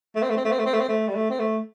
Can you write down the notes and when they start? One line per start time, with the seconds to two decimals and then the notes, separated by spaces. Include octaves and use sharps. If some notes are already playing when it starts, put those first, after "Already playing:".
0.15 A3
0.23 C4
0.30 A3
0.37 C4
0.45 A3
0.52 C4
0.59 A3
0.66 C4
0.74 A3
0.81 C4
0.88 A3
1.08 G3
1.15 A3
1.30 C4
1.39 A3